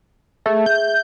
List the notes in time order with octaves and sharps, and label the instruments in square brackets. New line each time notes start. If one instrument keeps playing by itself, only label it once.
[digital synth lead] A3 [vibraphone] G#4 E5
[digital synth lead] G6